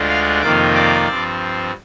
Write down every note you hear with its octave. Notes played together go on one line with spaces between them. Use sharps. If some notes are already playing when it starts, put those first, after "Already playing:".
Already playing: D2 D3 G#3 D4 F4
F5 F6
F2 C3 D#3 A#3 F4 D5 D6
D5 D6
G2 F3 C4